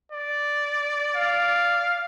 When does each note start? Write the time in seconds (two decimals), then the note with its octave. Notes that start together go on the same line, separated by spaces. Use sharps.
0.12 D5
1.16 F5